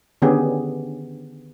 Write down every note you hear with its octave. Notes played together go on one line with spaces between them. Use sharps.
D3 D#3 B3 C#4 G4 G#4